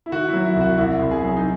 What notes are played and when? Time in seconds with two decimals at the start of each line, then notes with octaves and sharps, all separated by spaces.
0.06 E4
0.12 D#3 F#4
0.28 E4
0.33 F#3
0.45 E4
0.56 C2
0.61 F#4
0.78 C2 E4
0.99 C2
1.11 G#4
1.22 F#3
1.37 D#4